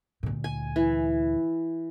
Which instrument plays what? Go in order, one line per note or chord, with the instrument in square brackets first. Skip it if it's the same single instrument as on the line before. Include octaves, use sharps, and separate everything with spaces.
[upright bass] D2 A#2
[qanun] G#5
E3